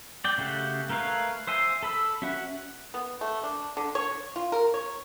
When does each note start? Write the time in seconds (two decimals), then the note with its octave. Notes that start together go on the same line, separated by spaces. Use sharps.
0.25 D5 G5
0.38 C#3 A3 F#4 G4
0.89 A3 A#4 B4 C#5 F5
1.47 C5 E5 G#5 C6
1.83 A4 B5 E6
2.22 C#4 F#4 E5 F#5
2.94 B3
3.21 A3
3.43 D4
3.77 D3
3.95 C#5
4.36 F4
4.52 A#4
4.74 C#5